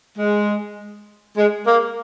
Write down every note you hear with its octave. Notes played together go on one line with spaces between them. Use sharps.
G#3
G#3
A#3